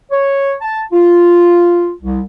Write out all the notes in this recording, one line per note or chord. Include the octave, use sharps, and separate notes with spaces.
C#5
A5
F4
C2